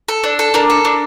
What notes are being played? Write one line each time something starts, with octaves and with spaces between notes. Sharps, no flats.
A4
D4
A4
D4 A#4
A4
D4